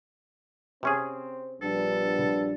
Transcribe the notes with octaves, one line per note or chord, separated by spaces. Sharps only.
C3 C4 C#4 G#4
A#1 G3 B3 D4 A4